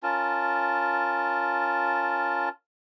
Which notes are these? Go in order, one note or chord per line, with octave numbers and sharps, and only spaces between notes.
C#4 F4 A#4 A5